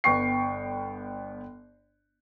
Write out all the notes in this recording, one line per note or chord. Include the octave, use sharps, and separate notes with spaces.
G1 B3 G5 C#6 C7